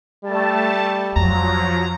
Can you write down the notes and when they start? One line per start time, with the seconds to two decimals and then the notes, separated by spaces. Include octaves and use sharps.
0.25 G3 A3 A5
1.16 F2 F3 F#3 A#5